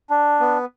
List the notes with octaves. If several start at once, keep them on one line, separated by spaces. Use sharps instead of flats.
D4
B3